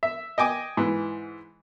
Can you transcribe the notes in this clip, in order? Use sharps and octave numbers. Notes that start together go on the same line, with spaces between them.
E5
D#5 G5 G#5 D6
G#2 E3